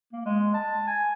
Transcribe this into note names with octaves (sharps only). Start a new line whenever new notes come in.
A#3
G#3
A5
G#5